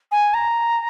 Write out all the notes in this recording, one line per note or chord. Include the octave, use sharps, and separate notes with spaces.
G#5
A#5